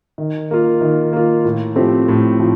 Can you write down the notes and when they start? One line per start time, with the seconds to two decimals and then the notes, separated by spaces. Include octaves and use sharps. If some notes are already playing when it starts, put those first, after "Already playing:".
0.18 D#3
0.51 A#3 F4
0.81 D#3
1.13 A#3 F4
1.45 A2
1.76 F3 A3 C4 G4
2.08 A2
2.40 F3